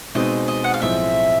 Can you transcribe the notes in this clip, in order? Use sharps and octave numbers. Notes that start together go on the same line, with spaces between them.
B2 G#3 C4 D#4 D#5
D#5
F#5
F5
B1 A2 F3 G#3 C4 E5